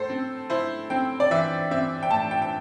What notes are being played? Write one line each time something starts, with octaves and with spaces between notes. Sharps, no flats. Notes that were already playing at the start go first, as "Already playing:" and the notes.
Already playing: A2 A4 C5
C4
E4 C5
C4 G5
D5
E3 E5
C4 E5
G5
A2 A5
G5
G5